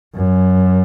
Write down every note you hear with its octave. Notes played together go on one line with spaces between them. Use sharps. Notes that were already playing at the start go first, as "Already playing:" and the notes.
F#2